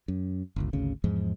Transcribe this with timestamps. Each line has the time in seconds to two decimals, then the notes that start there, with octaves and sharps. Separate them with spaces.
0.08 F#2
0.56 G1 C#2
0.73 G#1 D2 C#3
1.04 E2 G#2 F3 G#3